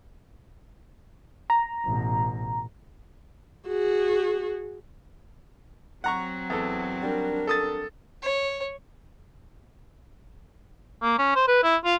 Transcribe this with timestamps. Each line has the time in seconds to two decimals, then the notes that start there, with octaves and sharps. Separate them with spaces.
1.50 A#5
1.85 A1 B2
3.68 F#4 G#4
6.04 F#3 C4 F#5 A#5 C#6
6.50 E2 A4
7.03 G3 D4 A#4
7.47 A4 D#6 A6
8.22 C#5
11.02 A#3
11.19 C#4
11.36 C5
11.48 B4
11.64 E4
11.84 F4